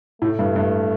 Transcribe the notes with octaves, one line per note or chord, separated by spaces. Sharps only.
A2 A3
G2
G2